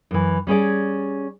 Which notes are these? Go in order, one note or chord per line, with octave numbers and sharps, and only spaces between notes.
F#2 E3
G3 C#4 G#4 D5